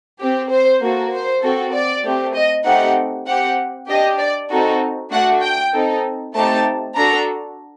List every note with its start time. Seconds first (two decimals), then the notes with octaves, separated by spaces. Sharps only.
0.20 C4 G4
0.51 C5
0.81 A#3 F#4 A4
1.12 C5
1.43 C4 F#4 A4
1.73 D5
2.04 A3 C4 G4
2.35 D#5
2.65 A3 C4 D#4 G4 F#5
3.27 C4 G4 F#5
3.89 D4 G4 D#5
4.19 D5
4.50 C4 D#4 F#4 A4
5.12 A3 D4 F#4 F#5
5.42 G5
5.73 C4 D#4 A4
6.34 A3 C4 D#4 G4 A5
6.96 D4 F#4 A4 A#5